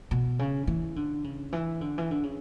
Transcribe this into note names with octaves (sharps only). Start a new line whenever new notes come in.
B2
C#3
E3
D3
C#3
E3
D3
E3
D3
C#3